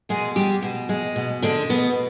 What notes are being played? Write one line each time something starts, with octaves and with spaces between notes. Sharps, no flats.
B2 G#3 G#4
G3 G#3 G4
B2
G#3
B2
D3 G#3 D4
B2 B3